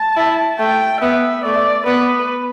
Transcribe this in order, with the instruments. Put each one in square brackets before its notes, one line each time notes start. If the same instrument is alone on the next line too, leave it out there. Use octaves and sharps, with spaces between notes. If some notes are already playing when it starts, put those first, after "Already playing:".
Already playing: [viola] A5
[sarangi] E4
[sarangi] A3 [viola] G5
[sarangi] B3 [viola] E5
[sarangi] A3 [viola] D5
[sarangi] B3 [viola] B4